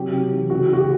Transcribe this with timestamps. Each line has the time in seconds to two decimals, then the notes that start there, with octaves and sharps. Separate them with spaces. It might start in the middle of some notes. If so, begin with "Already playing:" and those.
Already playing: C3 F#3 G4
0.12 C3
0.32 E3
0.50 C#3 F#4
0.69 C#3 F#4
0.78 G4